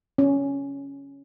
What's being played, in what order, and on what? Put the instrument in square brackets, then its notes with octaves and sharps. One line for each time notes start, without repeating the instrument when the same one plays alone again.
[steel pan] C#4